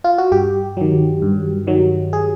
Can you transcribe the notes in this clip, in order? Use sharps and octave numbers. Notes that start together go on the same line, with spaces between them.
F4
F#4
G2 G4
D#3 F#3
G2
D#3 F#3
G#4